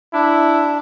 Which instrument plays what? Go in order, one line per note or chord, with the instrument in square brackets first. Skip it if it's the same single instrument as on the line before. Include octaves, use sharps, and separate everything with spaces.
[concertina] D4 [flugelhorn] E4